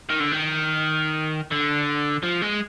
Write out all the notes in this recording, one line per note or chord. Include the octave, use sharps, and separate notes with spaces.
D#3
D3
D#3
D3
F3
G#3